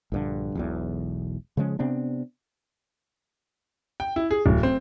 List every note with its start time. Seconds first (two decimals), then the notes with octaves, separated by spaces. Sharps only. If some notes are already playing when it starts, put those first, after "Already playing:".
0.12 A#1 G2 D3
0.55 E1 B1 E2
1.57 C#3 F3 G#3 C#4
1.79 C3 B3 C4 D4
4.00 G5
4.16 E4
4.31 G#4
4.46 D1
4.63 C4